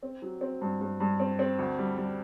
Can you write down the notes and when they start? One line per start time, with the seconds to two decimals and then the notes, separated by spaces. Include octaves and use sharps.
0.03 C4
0.22 F#3
0.41 C4
0.61 G2
0.81 G2
1.00 G2
1.20 C4
1.39 C4
1.59 D2
1.78 G3
1.98 G3